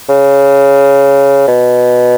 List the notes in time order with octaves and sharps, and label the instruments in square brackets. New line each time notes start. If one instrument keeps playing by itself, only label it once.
[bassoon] C#3
B2